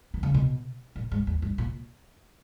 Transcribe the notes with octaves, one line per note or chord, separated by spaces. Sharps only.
D#3
C#3
B2
A#2
G#2
E2
G2
A#2